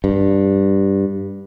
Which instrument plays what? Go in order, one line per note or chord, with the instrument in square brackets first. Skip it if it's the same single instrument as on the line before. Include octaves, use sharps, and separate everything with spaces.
[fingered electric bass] G2